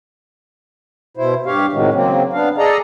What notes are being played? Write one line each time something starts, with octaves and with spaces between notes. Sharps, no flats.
B2 E4 C5
G2 G4 C#5 F5
A2 C3 D#3 F#3 G#3
C#3 F#3 A#3 C4
B3 D4 F5
G#4 A4 D5 D#5 A#5